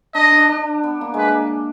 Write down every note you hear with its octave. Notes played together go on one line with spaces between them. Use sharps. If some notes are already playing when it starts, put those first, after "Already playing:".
D4 D#5
D4
D4
B3
A#3
G#3 B4
A#3